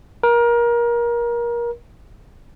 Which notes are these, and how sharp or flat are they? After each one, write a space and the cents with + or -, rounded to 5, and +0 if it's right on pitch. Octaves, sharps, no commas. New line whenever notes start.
A#4 +25